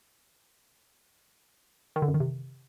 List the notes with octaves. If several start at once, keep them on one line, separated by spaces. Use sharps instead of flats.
D#3
D3
F#2
D#3
C3